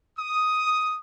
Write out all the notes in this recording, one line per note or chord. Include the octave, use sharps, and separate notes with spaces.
D#6